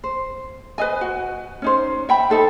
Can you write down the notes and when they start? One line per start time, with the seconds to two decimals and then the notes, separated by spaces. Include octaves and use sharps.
0.04 C5
0.78 B4 C5 D#5 G#5
1.01 F#4
1.62 C#4 D#4 C5
2.09 E5 G5 B5
2.30 D#4 A4 C5